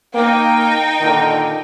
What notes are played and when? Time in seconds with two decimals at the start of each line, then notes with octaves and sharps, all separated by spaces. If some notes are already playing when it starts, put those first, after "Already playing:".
0.15 A#3 D#4 G5
1.01 A#2 D3 D#3